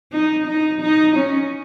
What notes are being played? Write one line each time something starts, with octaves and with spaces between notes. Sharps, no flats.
D#4
D#4
D#4
C#4